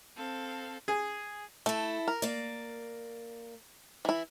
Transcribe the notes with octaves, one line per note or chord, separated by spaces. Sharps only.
C4 A4 F5
G#4
A3 E4 A4
A#4
A#3 D5
E3 E4